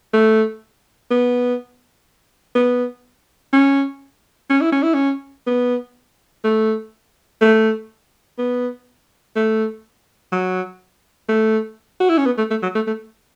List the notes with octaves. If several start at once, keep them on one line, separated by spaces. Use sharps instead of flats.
A3
B3
B3
C#4
C#4
E4
C#4
E4
C#4
B3
A3
A3
B3
A3
F#3
A3
F#4
E4
C#4
B3
A3
A3
F#3
A3
A3